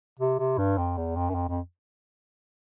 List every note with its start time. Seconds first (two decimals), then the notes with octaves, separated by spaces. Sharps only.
0.20 C3
0.39 C3
0.58 G2
0.78 F2
0.97 E2
1.16 F2
1.30 F#2
1.35 F2
1.49 F2